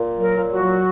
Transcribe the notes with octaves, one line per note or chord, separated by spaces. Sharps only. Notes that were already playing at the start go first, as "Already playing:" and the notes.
Already playing: A#2
F#3
A#4
A#2
F#4
F#3